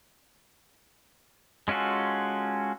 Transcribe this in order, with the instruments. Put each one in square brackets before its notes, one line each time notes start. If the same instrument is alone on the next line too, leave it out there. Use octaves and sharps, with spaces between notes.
[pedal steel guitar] G#3 C#4 F4 F#4 A4